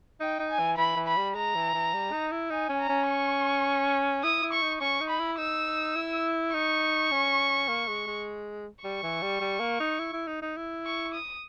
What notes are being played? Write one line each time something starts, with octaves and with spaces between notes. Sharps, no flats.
D#4 G5
D#4
G#5
E3
E3 B5
E3
B5
G3
G#3 A#5
E3
E3
G3
D#4
E4
D#4 G#5
C#4
A#5
C#4
C#6
E4 D#6
E4
C#6
D#4
C#4 C#6
D#4
B5
E4
D#4 E6
E4
D#4 C#6
C#4
A#3
G#3
G#3
G3 C#6
E3
G3
G3
A#3
D#4
E4
E4
D#4
D#4
E4
C#6
D#6